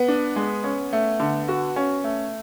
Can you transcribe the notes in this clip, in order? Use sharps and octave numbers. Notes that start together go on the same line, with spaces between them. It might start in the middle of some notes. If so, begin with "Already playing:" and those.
Already playing: B3
D4
G#3
C#4
A3
D3
F#4
C#4
A3